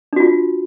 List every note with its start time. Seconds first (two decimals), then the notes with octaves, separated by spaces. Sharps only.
0.13 D4
0.16 F#4
0.20 F4